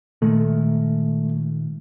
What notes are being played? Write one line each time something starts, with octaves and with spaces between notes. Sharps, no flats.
A#2 D#3 G#3 A3